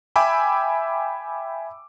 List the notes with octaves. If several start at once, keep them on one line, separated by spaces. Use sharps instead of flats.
E5 G5 G#5 B5 D6 E6